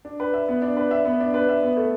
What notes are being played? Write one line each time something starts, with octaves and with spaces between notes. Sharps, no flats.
D4
B4
E5
B3
D4
B4
E5
B3
D4
B4
E5
B3
A3